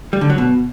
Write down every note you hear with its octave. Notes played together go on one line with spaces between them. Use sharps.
G3
D3
F#3
B2